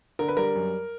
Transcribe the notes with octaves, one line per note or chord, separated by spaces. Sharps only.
D3 A#4
B4
G3 A#4
F#2